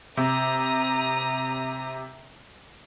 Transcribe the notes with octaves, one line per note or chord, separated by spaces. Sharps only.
C3 A#5 D#6